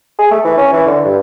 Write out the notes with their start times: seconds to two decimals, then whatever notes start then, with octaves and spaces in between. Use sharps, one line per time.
0.19 G#4
0.31 A3
0.45 E3
0.58 C#4
0.73 E3
0.87 D3
1.05 G2